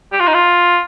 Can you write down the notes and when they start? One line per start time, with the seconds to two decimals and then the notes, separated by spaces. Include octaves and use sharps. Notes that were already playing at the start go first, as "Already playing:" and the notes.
0.13 G4
0.20 F4
0.28 D#4
0.34 F4